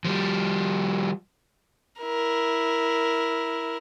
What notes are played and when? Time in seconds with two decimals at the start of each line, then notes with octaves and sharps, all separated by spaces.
0.05 F3 G3
2.01 E4 A#4